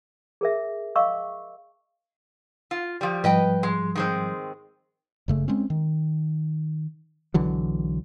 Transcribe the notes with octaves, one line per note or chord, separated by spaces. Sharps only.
G#4 A#4 E5
D#5 F5 C#6 D6 E6
F4
F3 G3
G#2 F3 G3 B4 D#5 G5
G#3
D#3 G#3 C4
F#1 C#3 A3
G#3 C4 C#4
D#3
B1 D3 E3 F#3